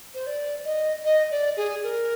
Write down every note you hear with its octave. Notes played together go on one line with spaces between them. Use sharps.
C5
D5
D#5
D#5
D5
G#4
A#4